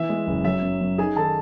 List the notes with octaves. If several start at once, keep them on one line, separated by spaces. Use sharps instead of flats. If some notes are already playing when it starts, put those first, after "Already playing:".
Already playing: E3 E5
G#3
F#1
F#3 E5
F#2
F#2
D#4 G#4 G#5
D#3 A4 A5